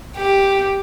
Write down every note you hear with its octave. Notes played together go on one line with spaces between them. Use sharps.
G4